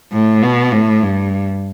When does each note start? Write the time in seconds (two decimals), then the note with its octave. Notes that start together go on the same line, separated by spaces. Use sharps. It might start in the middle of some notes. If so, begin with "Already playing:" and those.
0.13 A2
0.42 B2
0.72 A2
1.03 G2